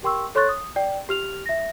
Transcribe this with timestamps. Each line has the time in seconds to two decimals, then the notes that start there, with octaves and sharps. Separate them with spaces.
0.03 G4 A#4 G5 C6 C#6 E6
0.35 A4 C#5 C6 C#6 F#6 A6
0.49 D#6
0.76 D5 G5
1.09 G4 F6 F7
1.46 E5 A#6